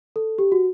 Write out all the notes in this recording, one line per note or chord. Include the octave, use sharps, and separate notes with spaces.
A4
G4
F#4